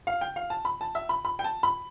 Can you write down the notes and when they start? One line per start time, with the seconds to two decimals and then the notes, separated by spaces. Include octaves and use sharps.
0.07 F5
0.21 G5
0.36 F5
0.50 A5
0.65 B5
0.81 A5
0.95 E5
1.09 B5
1.25 B5
1.39 G5
1.44 A5
1.63 B5